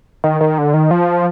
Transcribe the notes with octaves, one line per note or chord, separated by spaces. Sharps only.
D#3
D#3
D3
D#3
F3